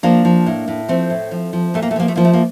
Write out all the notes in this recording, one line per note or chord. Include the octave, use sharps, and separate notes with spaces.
F3 A#3 D4
F3
A2
A2
F3 A3 C4
A2
F3
F3
A#2 A3
A#3
A3
F3 A#3
A3
F3 A#3
A3
A#3